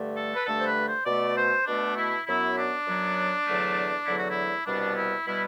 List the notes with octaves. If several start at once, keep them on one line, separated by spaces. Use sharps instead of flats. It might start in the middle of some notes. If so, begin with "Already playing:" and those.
Already playing: G2 D3 A3
A4
B4
G2 D3 A3 A4
C5
B4
C5
B2 A3 D5
C5
B2 A3 D4
E4
F#2 F#3 B3 E4
D4
F#2 F#3 B3
E2 D3 F#3 A3
E2 D3 F#3 A3 E4
F#4
E4
C2 B2 G3 B3 D4
E4
B2 G3 B3 E4